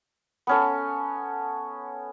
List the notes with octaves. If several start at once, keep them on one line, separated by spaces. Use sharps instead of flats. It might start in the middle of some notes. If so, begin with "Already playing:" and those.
B3 C#4 A4